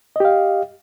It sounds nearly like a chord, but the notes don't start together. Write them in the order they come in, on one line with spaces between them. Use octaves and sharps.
D#5 G4 F5